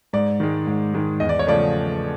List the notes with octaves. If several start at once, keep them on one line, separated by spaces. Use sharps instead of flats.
G#2 D5
D#3 G#3
G#2
D#3 G#3
E2 D#5
D5
C#5
C#3 F3 A3 D5